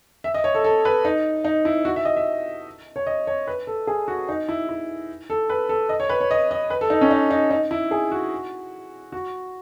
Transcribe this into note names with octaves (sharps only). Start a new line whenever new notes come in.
E5
D#5
C#5
A4
A4
B4
D#4
D#4
E4
F#4
E5
D#5
E5
C#5
D#5
C#5
B4
A4
G#4
F#4
D#4
E4
E4
A4
B4
A4
D#5
C#5
B4
C#5
D#5
D#5
B4
A4
D#4
C#4
D#4
D#4
D#4
E4
G#4
F#4
F#4